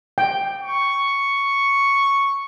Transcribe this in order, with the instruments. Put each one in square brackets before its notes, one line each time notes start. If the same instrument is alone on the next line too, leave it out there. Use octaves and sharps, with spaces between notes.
[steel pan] G5
[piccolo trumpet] C#6